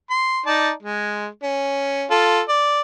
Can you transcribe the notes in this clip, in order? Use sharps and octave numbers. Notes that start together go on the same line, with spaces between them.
C6
D#4 D5 A5
G#3
C#4
F4 A4
D5